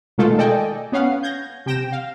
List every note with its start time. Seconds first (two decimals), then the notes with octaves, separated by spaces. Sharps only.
0.18 B2 D#3 G#3 A3 F4 A4
0.38 A4 D5 D#5 G5 G#5
0.92 B3 C#4 F5 F#5
1.23 G6 G#6 A#6
1.66 C3 G5 A#6 E7
1.92 F5